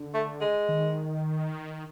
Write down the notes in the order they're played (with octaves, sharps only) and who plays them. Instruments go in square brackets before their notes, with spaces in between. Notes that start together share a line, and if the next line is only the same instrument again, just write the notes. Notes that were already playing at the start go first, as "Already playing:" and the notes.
Already playing: [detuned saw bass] D3
[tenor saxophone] A3
G#3
[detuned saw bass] D#3